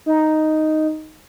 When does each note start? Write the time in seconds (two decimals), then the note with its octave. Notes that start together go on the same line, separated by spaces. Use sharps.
0.06 D#4